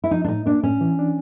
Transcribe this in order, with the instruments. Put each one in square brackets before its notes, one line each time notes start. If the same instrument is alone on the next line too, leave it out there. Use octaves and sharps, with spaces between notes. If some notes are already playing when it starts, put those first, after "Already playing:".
[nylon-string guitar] E4
[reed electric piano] F3 [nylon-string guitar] D#4
[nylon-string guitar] D4
[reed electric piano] A2 [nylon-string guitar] D#4
[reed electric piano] A#3 [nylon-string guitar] D4
[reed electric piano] A2 [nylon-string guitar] C#4
[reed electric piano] E3
D4